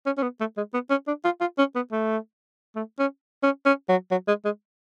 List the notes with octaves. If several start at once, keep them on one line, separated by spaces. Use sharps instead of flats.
C#4
C#4
B3
A3
G#3
B3
C#4
D4
F4
F4
C#4
B3
A3
A3
C#4
C#4
C#4
F#3
F#3
G#3
G#3